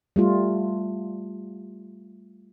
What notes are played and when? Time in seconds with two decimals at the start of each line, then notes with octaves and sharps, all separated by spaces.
0.16 G3 A3 F4